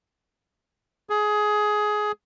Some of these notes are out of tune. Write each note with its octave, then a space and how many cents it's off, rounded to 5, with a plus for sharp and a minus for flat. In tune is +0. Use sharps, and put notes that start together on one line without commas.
G#4 +15